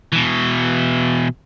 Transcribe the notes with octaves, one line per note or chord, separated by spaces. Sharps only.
B2 E3